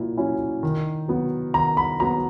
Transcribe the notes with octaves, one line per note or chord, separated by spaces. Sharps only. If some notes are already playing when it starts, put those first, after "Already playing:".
Already playing: A#2 F#3 E4
F#3 C#4 E4
D#3
F#3 B3
D#3 A#5
B5
F#3 B3 A#5